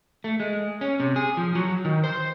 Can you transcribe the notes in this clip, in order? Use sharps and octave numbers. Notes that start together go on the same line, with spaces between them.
A3
G#3
C#4
C3
G#4
F3
F#3
D#3
C5